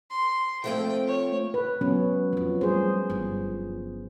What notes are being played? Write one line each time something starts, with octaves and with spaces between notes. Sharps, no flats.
C6
F3 A3 C4 G5
C#5
B4
F#3 G#3 B3 C#4
F2 F3 F4
G3 A3 G#4 C5
G1 G2